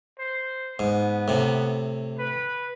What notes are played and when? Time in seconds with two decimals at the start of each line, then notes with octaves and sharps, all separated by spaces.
0.19 C5
0.79 G#2 B3
1.28 A2 C3
2.19 B4